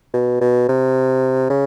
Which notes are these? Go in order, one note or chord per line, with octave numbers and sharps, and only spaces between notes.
B2
B2
C3
C#3